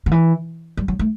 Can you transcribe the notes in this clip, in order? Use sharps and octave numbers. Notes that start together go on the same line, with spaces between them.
D3
E3
G3
F#3
A3